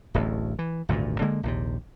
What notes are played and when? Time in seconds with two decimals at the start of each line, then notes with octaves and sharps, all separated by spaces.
0.14 D1 A1 D2
0.59 E3
0.89 G#1 D2 G2 A#2
1.21 D3 G#3 A#3
1.43 A#1 D#2 C3